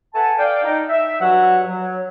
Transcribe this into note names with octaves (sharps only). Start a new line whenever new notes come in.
A4 B4 F#5 G#5 A5
D5 F5 G5
D#4
E5
G2 F#3 F#4 F#5
F#3